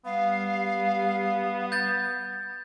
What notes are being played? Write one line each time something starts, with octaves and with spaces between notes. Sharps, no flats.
G3 B3 F5
G6 A6